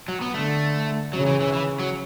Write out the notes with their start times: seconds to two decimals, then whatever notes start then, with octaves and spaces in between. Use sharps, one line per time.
0.08 F#3
0.21 B3
0.34 D3 A3
1.13 C#3 F#3
1.26 E3
1.40 E3
1.53 E3
1.79 F#3